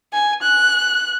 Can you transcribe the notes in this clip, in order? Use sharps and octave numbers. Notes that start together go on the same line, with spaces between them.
G#5
F#6